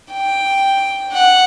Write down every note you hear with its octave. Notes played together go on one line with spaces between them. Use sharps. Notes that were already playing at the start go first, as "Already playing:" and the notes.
G5
F#5